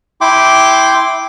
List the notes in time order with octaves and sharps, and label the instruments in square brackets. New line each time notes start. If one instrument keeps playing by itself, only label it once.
[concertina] E4 G5 C6 D6